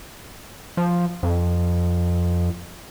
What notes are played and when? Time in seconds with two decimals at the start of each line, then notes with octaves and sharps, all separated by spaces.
0.77 F3
1.23 F2